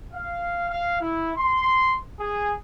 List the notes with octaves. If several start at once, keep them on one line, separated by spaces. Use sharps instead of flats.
F5
F5
E4
C6
G#4